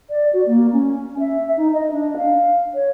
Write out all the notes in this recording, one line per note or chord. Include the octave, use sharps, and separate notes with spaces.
D5
F#4
A#3
C#4
E5
D#4
D#5
D4
F5
C#5